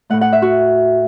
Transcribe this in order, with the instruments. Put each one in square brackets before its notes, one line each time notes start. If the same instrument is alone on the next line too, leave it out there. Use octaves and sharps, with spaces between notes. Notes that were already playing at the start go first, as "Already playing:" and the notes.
[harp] A2 A3 F#5
F#5
E5
F#4